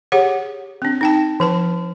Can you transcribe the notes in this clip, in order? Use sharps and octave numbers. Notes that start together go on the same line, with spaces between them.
G4 G#4 C#5 F#5
C4 D4
D#4 G5 A5
F3 B4 A5